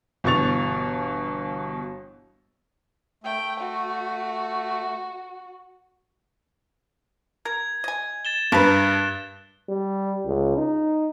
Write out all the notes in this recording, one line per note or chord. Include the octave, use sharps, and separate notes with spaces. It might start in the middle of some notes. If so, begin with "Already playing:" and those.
G1 B2 E3 C#6 A6 F7
A3 G5
F#4
A#4 G#6
D#5 G#5
A6 E7 G7
G2 A#4 B4 A5 F#6
G3
C#2
D#4